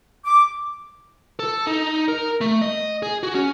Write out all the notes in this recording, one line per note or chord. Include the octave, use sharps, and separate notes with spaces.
D6
A4
D#4
A#4
A3
D#5
G#4
F#4
C#4